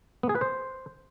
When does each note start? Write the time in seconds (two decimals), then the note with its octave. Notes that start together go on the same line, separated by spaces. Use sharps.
0.23 B3
0.29 G#4
0.35 B4
0.41 C5